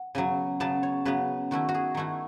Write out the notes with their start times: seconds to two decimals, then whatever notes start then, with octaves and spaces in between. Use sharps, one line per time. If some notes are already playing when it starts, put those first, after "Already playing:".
Already playing: F#5
0.15 C#3 F#3 B3 G#5
0.60 C#3 F#3 B3 A5
0.83 C#5
1.05 C#3 F#3 B3 B4
1.51 D#3 A3 E4 F#4
1.69 F#4
1.74 G#4
1.95 D#3 A3 E4 F#4